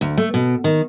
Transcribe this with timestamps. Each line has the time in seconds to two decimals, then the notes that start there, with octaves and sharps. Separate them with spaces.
0.01 D2
0.17 A3
0.34 B2
0.64 D#3